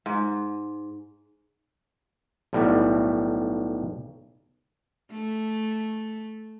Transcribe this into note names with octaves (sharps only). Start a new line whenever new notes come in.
G#2
B1 A2 G3
A3